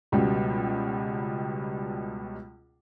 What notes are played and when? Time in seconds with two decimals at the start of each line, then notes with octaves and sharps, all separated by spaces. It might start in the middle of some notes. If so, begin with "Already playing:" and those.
0.12 C#2 B2 G3